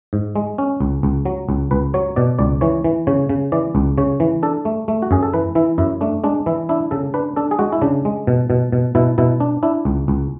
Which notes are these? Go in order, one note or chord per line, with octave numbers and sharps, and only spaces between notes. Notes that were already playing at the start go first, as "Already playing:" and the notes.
G#2
G#3
C#4
C#2
C#2
F#3
C#2
C#2 B4
F#3 C#5
B2 D5
C#2 D5
E3 C#5
E3
C#3 C#5
C#3
E3 D5
C#2
C#3 C#5
E3
D4 A4
A3
A3
F#4
F#2 G#4
A4
E3 B4
E3 E4
F#2 E4
A3 D4
G#3 D4
E3 E4
D4 E4
C#3 A4
D4 B4
D4 A4
G#4
G#3 F#4
E4
C#3 D4
G#3
B2
B2
B2
B2 E4
B2 E4
D4
D4 E4
C#2
C#2